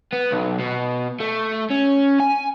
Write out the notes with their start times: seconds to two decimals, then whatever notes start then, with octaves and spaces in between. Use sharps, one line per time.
0.13 B3
0.32 B1
0.60 B2
1.20 A3
1.70 C#4
2.20 G#5